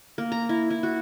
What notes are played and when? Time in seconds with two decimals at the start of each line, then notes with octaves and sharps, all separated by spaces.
0.18 A#3
0.32 A#5
0.49 E4
0.70 E4
0.83 F#4